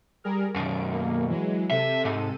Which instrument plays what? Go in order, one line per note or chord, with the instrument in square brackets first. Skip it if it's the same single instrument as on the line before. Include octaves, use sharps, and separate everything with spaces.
[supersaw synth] G3 G#4 A#4
[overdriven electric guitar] B1 F#2 [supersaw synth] D7
[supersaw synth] A#3
E3 F#3 G#3
[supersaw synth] C3 A4 D#7 [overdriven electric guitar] E5
[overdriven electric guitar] G#2